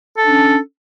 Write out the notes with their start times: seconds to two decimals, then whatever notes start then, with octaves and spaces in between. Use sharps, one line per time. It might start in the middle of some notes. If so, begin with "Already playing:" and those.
0.18 A4
0.23 D4
0.28 C#4